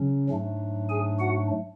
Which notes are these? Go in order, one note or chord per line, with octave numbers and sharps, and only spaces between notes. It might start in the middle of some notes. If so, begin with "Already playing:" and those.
Already playing: C#3 F#3 C#4
G#2 F#3 A3 D4
G#4 G#5
F#4 F#5